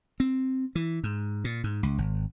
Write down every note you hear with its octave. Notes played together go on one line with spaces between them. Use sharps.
C4
E3
G#2
A#2
G#2
C#2
G#1